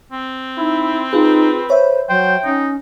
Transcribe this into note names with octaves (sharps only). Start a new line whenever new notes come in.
C4
D#4 E4
D#4 F4 G#4 B4
C5 C#5 E5
F#3 C5 G5
C#4 D#4